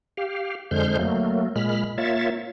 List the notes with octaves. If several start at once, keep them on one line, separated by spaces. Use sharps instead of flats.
G4 F5
F2 D3 G#3 C5 F6 G6
F#3 A3 A#3
A#2 G#3 B5 F6
A#3 F4 C#5 E5 A6